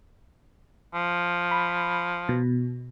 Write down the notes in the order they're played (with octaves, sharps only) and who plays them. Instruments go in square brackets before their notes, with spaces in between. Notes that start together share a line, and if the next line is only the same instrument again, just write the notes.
[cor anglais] F3
[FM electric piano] B5
B2